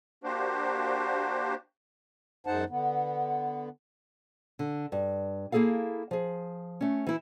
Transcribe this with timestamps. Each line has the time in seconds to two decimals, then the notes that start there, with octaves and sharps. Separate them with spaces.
0.24 A#3 D4 F#4 G4 C5
2.47 F#2 G#3 D#4 C5 F#5 A5
2.69 D3 B3
4.59 D3
4.92 G2
5.52 A#3 E4 G#4 A4 F5
6.11 F3 G#4
6.81 A3 C#4
7.07 E3 E4